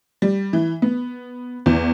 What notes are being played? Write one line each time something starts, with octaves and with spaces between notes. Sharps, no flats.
G3
E3
B3
E2